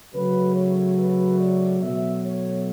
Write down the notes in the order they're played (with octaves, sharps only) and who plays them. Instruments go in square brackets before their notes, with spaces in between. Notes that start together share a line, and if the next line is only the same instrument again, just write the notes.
[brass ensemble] C#3 F#3 A3 B4
C#5
B4
D5
B2 F#3 A3 E5
C#5